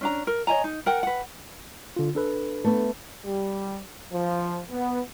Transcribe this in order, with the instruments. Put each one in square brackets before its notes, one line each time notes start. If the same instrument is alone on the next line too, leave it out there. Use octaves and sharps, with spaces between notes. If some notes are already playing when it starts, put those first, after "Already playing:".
[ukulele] C#4 D4 A#5
A#4
C#5 D#5 G#5 A#5
D#4
A#4 F#5 G5
B4 F#5
[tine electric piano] D3 F4
D4 A4 B4
[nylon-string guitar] A3 B3
[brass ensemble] G3
F3
B3